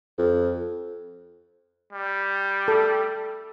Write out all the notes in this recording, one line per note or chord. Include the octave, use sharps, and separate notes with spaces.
F2
G3
A4